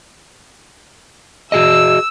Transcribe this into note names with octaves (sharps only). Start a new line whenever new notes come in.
F#4 G#4 D#5 E6